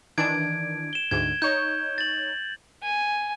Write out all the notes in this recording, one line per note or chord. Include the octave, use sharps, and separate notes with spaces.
D#3 E3 D4 G#6 D7
E7 G7
D2 G#2 G#6
D#4 C#5 G6
A6 F#7
G#5